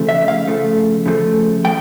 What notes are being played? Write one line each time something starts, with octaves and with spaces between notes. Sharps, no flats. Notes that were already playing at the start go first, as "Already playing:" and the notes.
Already playing: C#3 F3 A3
E5
F5
C#3 F3 A3
C#3 F3 A3
F3 A3 G5